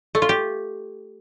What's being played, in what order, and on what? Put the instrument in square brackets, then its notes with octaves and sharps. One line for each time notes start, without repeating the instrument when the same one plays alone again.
[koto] A3
F4
G4